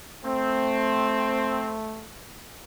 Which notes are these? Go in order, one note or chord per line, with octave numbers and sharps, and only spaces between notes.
A3 C4